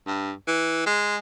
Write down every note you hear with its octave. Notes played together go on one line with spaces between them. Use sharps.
G2
E3
G#3